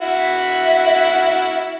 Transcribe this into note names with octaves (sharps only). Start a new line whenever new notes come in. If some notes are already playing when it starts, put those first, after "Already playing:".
E4 F#4 E5